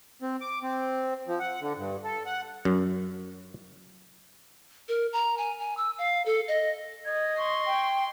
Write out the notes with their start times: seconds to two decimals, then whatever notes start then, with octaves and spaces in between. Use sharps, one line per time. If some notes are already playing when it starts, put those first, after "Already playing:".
0.22 C4
0.41 D6
0.63 C4
1.28 F3
1.40 F#5
1.61 D3
1.78 G2
2.04 A4
2.26 F#5
2.65 F#2
4.89 A#4
5.13 A#5
5.38 G#5
5.60 G#5
5.77 E6
5.98 F5
6.26 A4
6.48 D#5
7.05 D#5 G#6
7.38 C6 C#6
7.67 G5